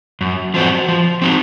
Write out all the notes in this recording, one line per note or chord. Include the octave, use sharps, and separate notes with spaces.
F#2
F3 C4 F#4
F3
C4 D#4 F#4